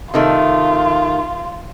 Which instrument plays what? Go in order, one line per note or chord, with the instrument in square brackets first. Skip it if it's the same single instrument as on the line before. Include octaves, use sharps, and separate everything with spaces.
[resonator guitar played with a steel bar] C3 D#3 A3 [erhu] F4